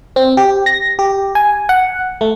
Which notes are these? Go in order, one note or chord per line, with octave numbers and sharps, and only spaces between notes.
C4
G4
A#6
G4
G#5
F#5
A3